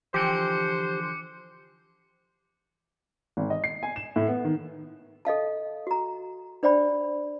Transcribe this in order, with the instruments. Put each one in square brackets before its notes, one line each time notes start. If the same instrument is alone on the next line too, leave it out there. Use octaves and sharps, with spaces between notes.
[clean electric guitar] D3 E3 F3 [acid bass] G4 [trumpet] C5 [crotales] D6 C#7
[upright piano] G#1
D#5
C7
G#5
E7
A2
B3
D#3
[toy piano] A4 D#5 F5 A5
F#4 A#5
D4 C5 D5 G5 B5